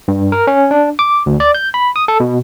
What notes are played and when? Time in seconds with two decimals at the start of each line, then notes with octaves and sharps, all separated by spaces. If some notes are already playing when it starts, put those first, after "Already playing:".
0.08 G2
0.32 A#4
0.47 C#4
0.71 D4
0.99 D6
1.26 D2
1.40 D5
1.55 G6
1.74 B5
1.96 D#6
2.08 A4
2.20 B2